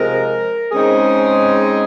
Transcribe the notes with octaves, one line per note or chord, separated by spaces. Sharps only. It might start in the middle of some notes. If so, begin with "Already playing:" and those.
Already playing: C3 F3 G#3 A#4
C#3 G#3 C4 D#4 G#4